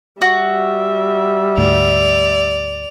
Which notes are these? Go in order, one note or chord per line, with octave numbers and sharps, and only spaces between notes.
G3 F#4 E5
D2 G#2 A3 D5 F7